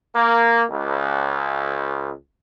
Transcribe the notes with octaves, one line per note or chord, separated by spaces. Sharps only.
A#3
C#2